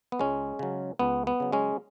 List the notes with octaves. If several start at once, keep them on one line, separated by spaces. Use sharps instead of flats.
B3
C#2 G#3 C#4
C#3 F#3
C#2 B3
B3
C#3 F#3
G#3 C#4